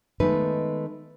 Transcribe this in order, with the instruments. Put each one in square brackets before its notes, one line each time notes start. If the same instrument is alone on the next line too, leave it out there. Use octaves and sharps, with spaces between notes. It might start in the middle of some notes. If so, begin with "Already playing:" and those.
[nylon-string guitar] D#3 G#3 A3 B3 D#4 B4